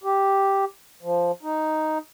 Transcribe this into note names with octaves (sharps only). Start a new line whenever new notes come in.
G4
F3
D#4